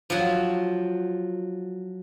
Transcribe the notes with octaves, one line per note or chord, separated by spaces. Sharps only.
F3 F#3